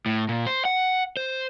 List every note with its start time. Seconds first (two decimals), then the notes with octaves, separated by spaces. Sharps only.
0.06 A2
0.29 A#2
0.47 C5
0.65 F#5
1.17 C5